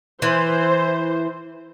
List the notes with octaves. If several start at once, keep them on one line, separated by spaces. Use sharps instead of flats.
E3 C5